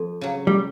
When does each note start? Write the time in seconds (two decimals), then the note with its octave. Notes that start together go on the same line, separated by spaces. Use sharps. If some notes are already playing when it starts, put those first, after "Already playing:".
Already playing: F2
0.21 C#3 F#3
0.47 G3